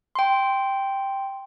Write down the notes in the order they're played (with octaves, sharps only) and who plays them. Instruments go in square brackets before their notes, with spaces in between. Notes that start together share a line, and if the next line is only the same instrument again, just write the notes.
[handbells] G5 C6